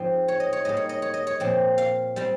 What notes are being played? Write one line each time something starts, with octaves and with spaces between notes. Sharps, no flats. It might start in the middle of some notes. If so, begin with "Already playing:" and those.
Already playing: G#2 F3 C4 F4
C#5
D#5
C#5
G#2 G3 A#3 D#5
C#5
D#5
C#5
D#5
C#5
A#2 F3 C4
F5
G3 C4